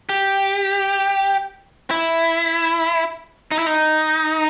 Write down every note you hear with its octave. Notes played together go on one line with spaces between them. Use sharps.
G4
E4
D#4
E4
D#4